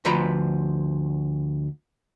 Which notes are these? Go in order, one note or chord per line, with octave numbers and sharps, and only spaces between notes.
D2 F3 B4 A#5 B5